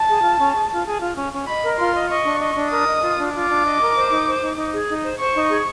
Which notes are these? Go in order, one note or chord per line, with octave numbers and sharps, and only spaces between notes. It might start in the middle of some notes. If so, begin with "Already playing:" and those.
Already playing: A5
G#4
F4
C#4
G#4
F4
G#4
F4
C#4
C#4
D#5 B5
A#4
F4 C6
D#5
D#5 C#6
D4
D#5
D4
A#4 D#6
D#5
F4
D4
F4 D6
D4
D#5
A#4
C5
D#4
C5
D#4
D#4
G#4
D#4
C5
C5 C#6
D#4
G#4